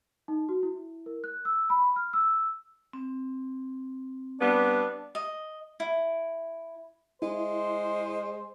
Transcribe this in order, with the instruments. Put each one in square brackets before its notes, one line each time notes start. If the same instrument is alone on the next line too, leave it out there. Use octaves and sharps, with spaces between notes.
[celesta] D#4
F#4
E4
A#4
F#6
E6
B5
F6
E6
[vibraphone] C4
[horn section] G3 B3 [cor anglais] D4
[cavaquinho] D#5
E4
[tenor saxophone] G#3 [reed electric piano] E4 [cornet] C5